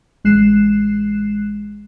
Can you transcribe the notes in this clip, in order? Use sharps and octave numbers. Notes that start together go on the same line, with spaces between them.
A1 G#3 F#6 C7 E7